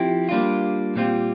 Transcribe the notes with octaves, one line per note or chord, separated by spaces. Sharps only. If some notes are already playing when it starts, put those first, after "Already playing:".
Already playing: F3 C4 E4 G4
G3 A#3 D4 F4
A#2 G3 C4 F4